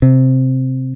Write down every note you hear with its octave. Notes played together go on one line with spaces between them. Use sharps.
C3